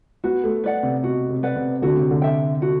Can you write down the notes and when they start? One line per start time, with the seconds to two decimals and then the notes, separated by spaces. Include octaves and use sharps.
0.24 B3 F#4
0.44 A3
0.64 B4 D5 F#5
0.83 C3
1.03 B2 F#4
1.30 C3
1.43 B4 D5 F#5
1.56 C3
1.82 D3 F#4
1.97 C3
2.11 D3
2.22 A4 E5 G5
2.62 F#4